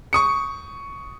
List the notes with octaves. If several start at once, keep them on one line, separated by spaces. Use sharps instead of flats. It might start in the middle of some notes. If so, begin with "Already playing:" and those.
C#6 D#6 C#7